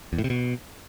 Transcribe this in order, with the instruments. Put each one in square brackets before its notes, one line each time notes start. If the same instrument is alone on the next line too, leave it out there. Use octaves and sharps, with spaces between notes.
[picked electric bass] E2
A2
C3
B2